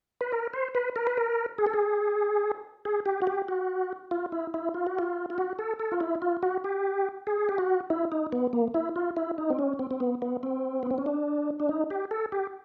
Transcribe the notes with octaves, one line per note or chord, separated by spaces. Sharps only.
B4
A#4
C5
B4
A#4
B4
A#4
G#4
A4
G#4
G#4
G4
F#4
G4
F#4
F4
E4
E4
F4
F#4
F4
F4
F#4
A4
A4
F4
E4
F4
F#4
G4
G#4
G4
F#4
E4
D#4
B3
A#3
E4
F4
E4
D#4
C4
C#4
C4
C4
B3
B3
C4
B3
C4
C#4
D4
D4
D#4
G4
A4
G4